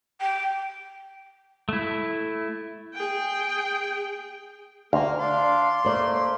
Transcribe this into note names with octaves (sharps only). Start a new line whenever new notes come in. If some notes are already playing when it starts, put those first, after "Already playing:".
G5
A3 E4
G#4 G5
D2 A#3 F6
D4 D5 F5 C6
A3 A#3 C5 D5